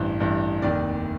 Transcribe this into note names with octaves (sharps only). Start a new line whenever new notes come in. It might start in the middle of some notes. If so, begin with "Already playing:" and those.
Already playing: A1 G2 E3 C5
A1 G2 E3
F1 D#2 D#3 D5